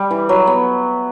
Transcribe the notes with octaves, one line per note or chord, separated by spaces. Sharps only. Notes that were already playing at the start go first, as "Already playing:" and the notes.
Already playing: G3
E3
F#3
B3